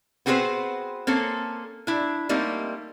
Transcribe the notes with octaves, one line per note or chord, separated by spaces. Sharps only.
B3 C4 F#4 G#4 B4 C5
A#3 C4 C#4 A4
D4 E4
G3 A3 A#3 C4 D#4